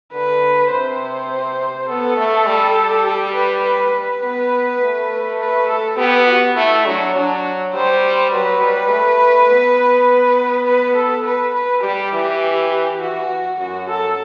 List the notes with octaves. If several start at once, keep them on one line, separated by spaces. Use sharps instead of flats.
D3 B4
C3 C5
B3 A4
A3
G3
G4
B4
B4
B4
B3
A3
B4
A4
B3 G4
F#4
A3 E4
F#3 D4
F#3 D4
G3 C5
F#3 B4
G3
A3
B3
B4
A4
B4
B4
G3 G4
E3
E3 F#4
F#2 F#4
A4